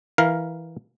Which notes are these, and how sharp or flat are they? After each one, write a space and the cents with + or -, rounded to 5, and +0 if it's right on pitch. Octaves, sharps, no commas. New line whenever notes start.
E3 -5 A#4 +10 F5 +0